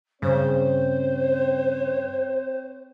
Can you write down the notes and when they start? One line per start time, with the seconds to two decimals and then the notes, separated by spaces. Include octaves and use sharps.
0.22 G2 C#3 C4 C5 C#5